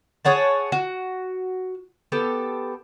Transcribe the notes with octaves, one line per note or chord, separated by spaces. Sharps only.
G#4 C#5 F#5 A5
F#4
B3 G4 A4